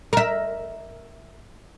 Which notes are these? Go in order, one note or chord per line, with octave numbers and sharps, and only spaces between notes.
A#4 E5